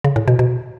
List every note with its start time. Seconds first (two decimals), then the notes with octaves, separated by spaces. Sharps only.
0.04 C#3
0.16 A2
0.28 B2
0.39 B2